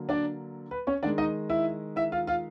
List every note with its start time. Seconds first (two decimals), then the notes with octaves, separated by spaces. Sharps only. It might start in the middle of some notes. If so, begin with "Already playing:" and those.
Already playing: D3 F#3 A#3
0.09 D4 D5
0.71 B4
0.87 C#4 C#5
1.03 D#3 G#3 D4 D5
1.18 D#4 D#5
1.50 E4 E5
1.96 E4 E5
2.12 F4 F5
2.27 F4 F5